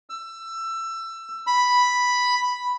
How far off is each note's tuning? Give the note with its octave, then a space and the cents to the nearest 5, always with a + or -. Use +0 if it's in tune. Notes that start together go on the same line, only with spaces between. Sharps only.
E6 +20
B5 +0